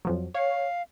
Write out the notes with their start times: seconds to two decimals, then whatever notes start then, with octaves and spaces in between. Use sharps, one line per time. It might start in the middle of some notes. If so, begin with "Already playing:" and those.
0.05 F2 F3 F#3
0.34 C#5 F5